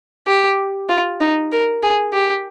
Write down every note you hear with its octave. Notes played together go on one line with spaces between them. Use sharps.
G4
F4
D#4
A#4
G#4
G4